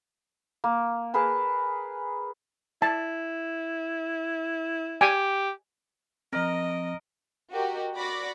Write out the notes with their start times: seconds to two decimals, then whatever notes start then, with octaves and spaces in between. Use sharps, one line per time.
0.64 A#3
1.14 G#4 A#4 B4 A5
2.82 E4 A5
5.01 G4 G#5
6.33 F3 C4 A#4 D#5
7.51 F#4 G4 A#4 D#5
7.96 F#4 D5 B5 D6 A#6